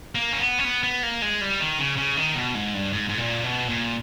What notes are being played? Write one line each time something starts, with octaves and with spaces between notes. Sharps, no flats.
A#3
C#4
B3
C#4
B3
B3
A#3
G#3
G3
D#3
C#3
C#3
D#3
B2
G#2
G2
G#2
G#2
A#2
B2
A#2